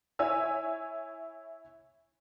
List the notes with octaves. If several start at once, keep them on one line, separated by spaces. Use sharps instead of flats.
E4 C#5 G#5 E6